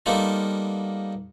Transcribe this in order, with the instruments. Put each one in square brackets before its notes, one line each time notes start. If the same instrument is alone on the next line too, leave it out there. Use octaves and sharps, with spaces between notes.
[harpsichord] G3 A#3 B3 D#4 F4 A4